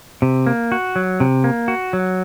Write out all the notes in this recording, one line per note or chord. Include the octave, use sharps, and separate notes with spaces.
C3
A#3
F#4
F#3
C3
A#3
F#4
F#3